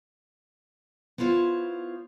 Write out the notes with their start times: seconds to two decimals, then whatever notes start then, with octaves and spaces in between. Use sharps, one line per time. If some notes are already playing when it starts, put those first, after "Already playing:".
1.18 B3 E4 F4 C5 C#5